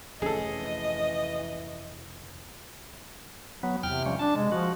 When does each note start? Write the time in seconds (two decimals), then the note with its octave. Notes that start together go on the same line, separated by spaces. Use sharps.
0.22 F1 E3 C#4 G#4 A4 D#5
3.63 F#3 B3
3.83 E2 C3 G5 F6
4.06 F3 G3 C#4
4.19 D4 A5
4.36 C3 G#3
4.52 F3 F#4